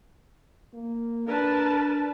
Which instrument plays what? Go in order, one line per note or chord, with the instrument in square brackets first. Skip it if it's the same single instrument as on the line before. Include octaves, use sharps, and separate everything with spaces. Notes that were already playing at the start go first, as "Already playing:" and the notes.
[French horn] A#3
[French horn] D4 [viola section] A#4 B4 A5